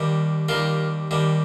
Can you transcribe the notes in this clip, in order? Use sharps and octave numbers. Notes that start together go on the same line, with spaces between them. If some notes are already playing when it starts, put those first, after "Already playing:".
Already playing: D#2 D#3 G3
D#2 D#3 G3 F4 A#4
D#2 D#3 G3